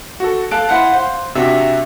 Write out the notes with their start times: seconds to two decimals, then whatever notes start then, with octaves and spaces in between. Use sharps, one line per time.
0.20 F#4 A4
0.51 A4 F5 F#6 D7
0.69 E4 C5 F#5
0.93 C5
1.35 C3 D4 F#4 E5